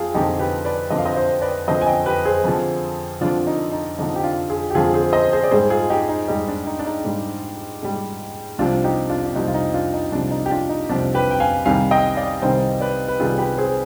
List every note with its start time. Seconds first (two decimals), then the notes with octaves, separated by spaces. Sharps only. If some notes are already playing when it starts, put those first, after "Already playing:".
Already playing: F2 F4 G#4
0.15 F2 D3 F3 D#4 G4
0.39 G4 B4
0.65 B4 D5
0.90 F2 D3 F3 D#5
0.98 F5
1.06 C5 D#5
1.16 C5 D#5
1.42 B4 D5
1.68 F2 D3 F3 C5 D#5
1.81 G#5
1.86 D#5 G5
2.06 G4 B4
2.25 G#4 C5
2.44 F2 D3 F3
3.21 F2 D3 F3 D4 F4
3.47 D#4
3.72 D#4
3.99 F2 D3 F3 D#4
4.16 G4
4.23 D4 F4
4.50 F4 G#4
4.70 G4
4.75 F2 D3 F3 F4 G#4
4.94 G#4 C5
5.13 C5 D#5
5.33 G#4 C5
5.43 D5
5.51 G#2 G3 G#4 C5
5.70 F4 G#4
5.90 D#4 G4
6.09 D#4
6.28 G#2 G3 D#4
6.48 D4
6.67 D#4
6.79 D4
6.87 D#4
7.05 G#2 G3
7.83 G#2 G3
8.58 C2 C3 F3 D4 F4
8.84 D#4 G4
9.09 D4 F4
9.26 D4
9.36 C2 C3 F3 D#4
9.48 F4
9.54 D#4
9.74 D4 F4
9.94 D#4
10.12 C2 C3 F3 D4
10.31 D#4
10.46 G4
10.51 D4 F4
10.69 D#4
10.89 C2 C3 F3 D4
11.14 G4 B4
11.31 G5
11.40 F5 G#5
11.65 C2 C3 D#3 G3 F5 G#5
11.91 D#5 G5
12.17 D5 F5
12.42 C2 C3 D#3 G3 C5 D#5
12.80 B4 D5
13.08 B4
13.19 C2 C3 D#3 G3 F4 G#4
13.38 G4 B4
13.57 G#4 C5